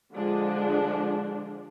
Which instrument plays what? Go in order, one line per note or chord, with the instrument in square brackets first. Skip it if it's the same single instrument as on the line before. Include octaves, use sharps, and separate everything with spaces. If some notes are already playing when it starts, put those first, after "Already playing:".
[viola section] D3 F3 G#3 D4